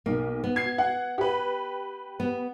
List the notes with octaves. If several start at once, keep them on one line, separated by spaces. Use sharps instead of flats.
B1 A#3
B3
G#6 C7
F#5
G4 B4
B3